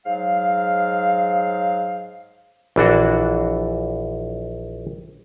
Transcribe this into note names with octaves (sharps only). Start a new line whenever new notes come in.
G#2 F#3 F5
A#1 E3 D4 F#4